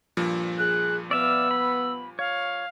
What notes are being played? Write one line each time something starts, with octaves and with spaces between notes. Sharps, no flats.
G2 A#2 F3
G#4 F#6
B3 D5 E5 F5 E6
B5
C#5 F5